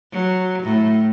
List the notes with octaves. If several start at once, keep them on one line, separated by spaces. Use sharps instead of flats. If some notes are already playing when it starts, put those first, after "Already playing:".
F#3
A2